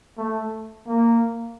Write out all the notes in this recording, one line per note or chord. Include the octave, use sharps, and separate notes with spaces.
A3
A#3